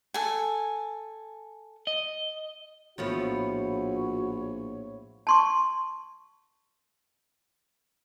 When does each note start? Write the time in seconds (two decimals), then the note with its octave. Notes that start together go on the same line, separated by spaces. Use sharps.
0.14 A4 G#5
1.87 D#5
2.98 A#1 A2 F3 B3 F#4 C#5
5.27 A5 C6 C#6